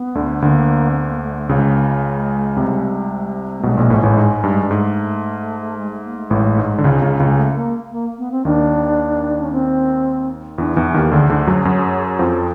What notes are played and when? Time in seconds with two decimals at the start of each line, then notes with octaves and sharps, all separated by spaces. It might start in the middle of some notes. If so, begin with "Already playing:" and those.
Already playing: B3
0.15 D2 D3
0.42 D2 D3 A#3
0.91 C4
0.97 B3
1.10 A#3
1.22 A3
1.36 A3
1.49 C#2 C#3 G#3
2.56 C2 C3
3.58 A3
3.63 B1 B2 G#3
3.77 A#1 A#2
3.90 A1 A2
4.03 A1 A2
4.17 G#2
4.43 G2
4.63 G2
4.71 G#2 A3
5.77 G#3
5.91 A3
6.04 A#3
6.17 A3
6.30 A1 A2 G#3
6.58 G#2
6.78 D3
6.84 C#2 C#3
7.02 C#2 C#3
7.20 C#2 C#3
7.26 G#3
7.37 A3
7.55 A#3
7.91 A#3
8.18 B3
8.31 C4
8.45 D#2 D#3 D4
9.42 C#4
9.52 C4
10.58 E2 E3 D4
10.76 E2 E3 D#4
10.94 D#2 D#3 G4
11.12 D2 D3 G#4
11.29 D2 D3
11.47 F#2 F#3
11.65 F#2 F#3
12.19 F2 F3 A4